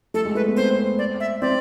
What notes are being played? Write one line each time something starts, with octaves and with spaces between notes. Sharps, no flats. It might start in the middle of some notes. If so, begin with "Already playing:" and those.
A3 A4
G#3
A3 B4
B3
C4 C5
D5
E5
C4 D5